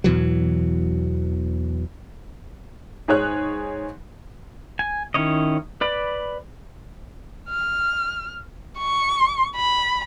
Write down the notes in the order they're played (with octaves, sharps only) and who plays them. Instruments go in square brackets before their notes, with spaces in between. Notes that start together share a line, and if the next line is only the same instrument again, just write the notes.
[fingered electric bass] E2 B2 E3 F#3
[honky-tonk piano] G#2 G#4 C#5 F#6
[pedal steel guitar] G#5
D#3 C#4 E4 C#5 D#5
B4 D5 B5
[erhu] F6
C#6
B5